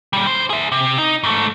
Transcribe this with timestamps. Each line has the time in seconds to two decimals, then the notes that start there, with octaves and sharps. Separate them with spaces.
0.13 A#2 G3
0.26 D3 C5
0.50 G#4 E5
0.72 C3
0.98 D#4
1.24 G#2 A3